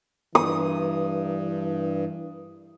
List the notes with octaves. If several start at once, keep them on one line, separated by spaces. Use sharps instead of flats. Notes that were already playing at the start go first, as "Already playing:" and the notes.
G2 E3 D#6